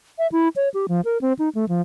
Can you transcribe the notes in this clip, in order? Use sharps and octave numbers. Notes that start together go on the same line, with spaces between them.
E5
E4
C#5
G4
F3
A#4
C4
D#4
A3
F3